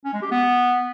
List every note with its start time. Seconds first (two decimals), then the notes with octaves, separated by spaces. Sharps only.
0.05 C#4
0.14 G#3
0.22 G4
0.31 B3